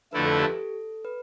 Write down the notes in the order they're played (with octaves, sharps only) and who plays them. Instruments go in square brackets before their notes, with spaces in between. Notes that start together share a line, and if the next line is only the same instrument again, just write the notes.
[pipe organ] F2 D3 A3 E4 [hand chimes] B4
[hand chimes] A4
G4
A4
B4